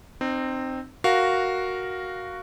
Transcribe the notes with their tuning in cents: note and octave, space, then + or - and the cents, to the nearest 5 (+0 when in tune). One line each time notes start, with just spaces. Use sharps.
C4 +0 D#4 -35
F#4 +0 A#4 +0 F5 +0